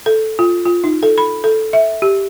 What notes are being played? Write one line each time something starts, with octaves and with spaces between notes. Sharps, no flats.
A4
F4
F4
D#4
A4
B5
A4
E5
G4